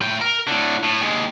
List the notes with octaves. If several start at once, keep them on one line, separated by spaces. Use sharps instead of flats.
A2 G5
A#4
A2 D3
A2
D#2 G#3